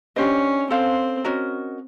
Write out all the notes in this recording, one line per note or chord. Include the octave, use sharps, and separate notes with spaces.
C#4 D4 G4 C5 D#5
C4 A4 C5 F5
C#4 F#4 A#4 D#5